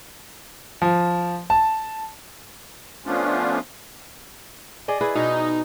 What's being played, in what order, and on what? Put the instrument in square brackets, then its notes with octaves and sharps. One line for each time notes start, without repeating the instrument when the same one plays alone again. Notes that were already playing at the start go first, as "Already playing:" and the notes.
[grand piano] F3
A5
[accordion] F3 A3 B3 C#4 D4 F4
[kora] G#4 D5 D#5
E4 G#4 B4
[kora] B2 [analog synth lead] D#4